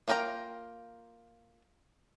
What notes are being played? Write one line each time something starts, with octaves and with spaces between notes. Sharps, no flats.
A#3 F4 A#4 G5 A#5